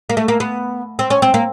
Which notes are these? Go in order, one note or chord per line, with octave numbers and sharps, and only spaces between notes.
A#3
A3
A#3
B3
C4
C#4
C4
A#3